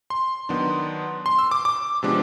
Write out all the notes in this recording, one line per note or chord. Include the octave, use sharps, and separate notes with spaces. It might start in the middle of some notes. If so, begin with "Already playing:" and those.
C6
D#3 F#3 B3 D4
C6
E6
D6
D6
C3 F3 G#3 B3 D4